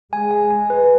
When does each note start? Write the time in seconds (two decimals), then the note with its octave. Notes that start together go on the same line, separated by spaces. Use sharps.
0.13 G#3 G#5
0.31 G#5
0.51 G#5
0.70 B4